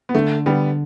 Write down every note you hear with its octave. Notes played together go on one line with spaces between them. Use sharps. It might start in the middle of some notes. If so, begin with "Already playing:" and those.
B3
D3 A3
D3 G3 B3